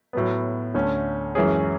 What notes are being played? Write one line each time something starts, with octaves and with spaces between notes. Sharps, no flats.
A2 F#3 B3
D2 D3 A3 C#4
F#2 E3 G#3 C#4 G#4